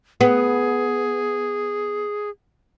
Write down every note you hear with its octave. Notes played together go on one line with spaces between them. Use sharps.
B3 G#4